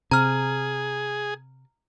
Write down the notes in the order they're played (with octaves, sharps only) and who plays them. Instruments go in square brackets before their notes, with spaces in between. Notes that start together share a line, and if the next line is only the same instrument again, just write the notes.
[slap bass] C3 [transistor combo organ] G#4 [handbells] A#5 F6